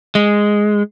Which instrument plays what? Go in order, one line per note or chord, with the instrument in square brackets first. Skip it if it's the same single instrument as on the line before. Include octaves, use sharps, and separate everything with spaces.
[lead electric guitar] G#3